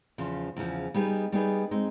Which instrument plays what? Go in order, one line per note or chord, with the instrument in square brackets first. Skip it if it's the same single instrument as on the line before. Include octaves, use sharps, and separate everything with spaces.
[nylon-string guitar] E2 C#3 F3
E2 C#3 F3
G3 B3 D#4 G#4 B4
G3 B3 D#4 G#4 B4
G#3 C4 D#4